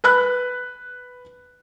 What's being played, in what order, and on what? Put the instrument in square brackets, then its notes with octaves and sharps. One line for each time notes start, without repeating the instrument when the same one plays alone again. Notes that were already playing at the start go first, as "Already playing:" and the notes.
[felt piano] B4 B5 F#6